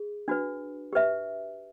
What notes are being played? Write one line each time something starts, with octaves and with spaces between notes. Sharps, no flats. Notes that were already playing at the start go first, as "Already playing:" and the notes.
Already playing: G#4
D4 F#4 B4
G4 B4 E5